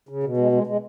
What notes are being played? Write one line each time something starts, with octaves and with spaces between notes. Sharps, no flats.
C#3
B2
G#3
G#3
G#3